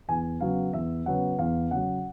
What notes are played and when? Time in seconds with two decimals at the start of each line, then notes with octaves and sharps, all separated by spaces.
0.08 E2 G#5
0.40 C#3 F#3 B3 F5
0.73 E2 E5
1.06 C#3 F#3 B3 F#5
1.39 E2 F5
1.71 C#3 F#3 F#5